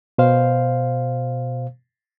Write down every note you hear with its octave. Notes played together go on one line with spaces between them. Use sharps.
B2 C5 F5